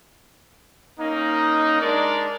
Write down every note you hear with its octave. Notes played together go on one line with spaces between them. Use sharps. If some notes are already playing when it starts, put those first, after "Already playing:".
A#3 C#4 D#4
G#3 D4 D#4 A#4 D5